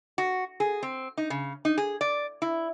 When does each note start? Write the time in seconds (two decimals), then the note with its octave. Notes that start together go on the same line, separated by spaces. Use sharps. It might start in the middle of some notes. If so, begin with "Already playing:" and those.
0.18 F#4
0.60 G#4
0.83 C4
1.17 D#4
1.30 C#3
1.65 D#4
1.78 G#4
2.01 D5
2.42 E4